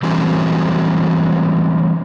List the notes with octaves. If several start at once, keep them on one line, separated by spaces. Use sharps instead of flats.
E3 F#3 G3 A3 C4 C#4